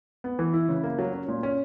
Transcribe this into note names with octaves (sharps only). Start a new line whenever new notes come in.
B3
E3
E4
C#3
A#3
F#3
C#4
A#2
C#4